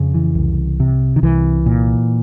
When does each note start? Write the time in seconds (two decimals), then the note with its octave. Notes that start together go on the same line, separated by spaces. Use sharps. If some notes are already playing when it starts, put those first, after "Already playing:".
Already playing: F2 C#3
0.14 E3
0.35 C2
0.80 C3
1.16 D#3
1.23 C2 E3
1.66 A#2